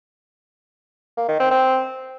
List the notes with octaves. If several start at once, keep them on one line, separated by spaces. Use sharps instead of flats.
A#3
D#3
C4
C4